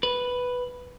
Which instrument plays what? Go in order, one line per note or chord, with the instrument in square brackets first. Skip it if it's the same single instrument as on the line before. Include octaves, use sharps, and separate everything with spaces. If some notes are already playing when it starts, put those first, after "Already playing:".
[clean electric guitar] B4